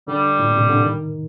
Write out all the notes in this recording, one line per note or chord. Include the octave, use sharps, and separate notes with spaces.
D3 G3
A2
A#2
C3
D3
D#3